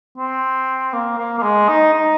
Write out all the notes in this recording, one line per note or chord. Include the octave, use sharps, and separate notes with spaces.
C4
A#3
A#3
A#3
G#3
D#4
D#4